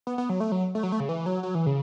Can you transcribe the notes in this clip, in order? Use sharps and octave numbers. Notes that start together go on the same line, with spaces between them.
B3
B3
F#3
A3
F#3
A3
F#3
A3
C#3
E3
F#3
F#3
E3
C#3